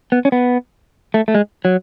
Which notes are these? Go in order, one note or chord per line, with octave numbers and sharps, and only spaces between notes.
B3
C#4
B3
A3
A3
G#3
F#3